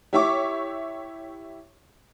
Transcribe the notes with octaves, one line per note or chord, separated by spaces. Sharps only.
E4 G4 C#5 E5 C#6 D6